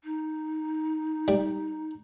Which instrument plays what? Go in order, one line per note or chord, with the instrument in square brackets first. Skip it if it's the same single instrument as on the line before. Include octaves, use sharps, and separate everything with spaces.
[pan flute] D#4
[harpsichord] G3